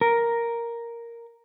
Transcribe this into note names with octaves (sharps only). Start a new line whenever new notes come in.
A#4